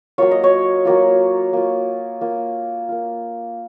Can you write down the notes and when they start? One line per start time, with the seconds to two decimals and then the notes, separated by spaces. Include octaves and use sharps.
0.18 F#3 A#3 F4 C#5
0.31 D#5
0.44 C#5
0.85 F#3 A#3 F4
1.53 A#3 F4
2.21 A#3 F4
2.89 A#3 F4